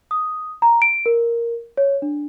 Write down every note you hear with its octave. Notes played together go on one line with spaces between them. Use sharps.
D#6
A#5
D7
A#4
C#5
D4